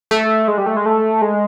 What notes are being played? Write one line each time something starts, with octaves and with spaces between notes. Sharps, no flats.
A3
G#3
G3
A3
G#3
A3
G#3